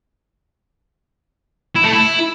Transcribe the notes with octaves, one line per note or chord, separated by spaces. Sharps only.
E4
A3
E4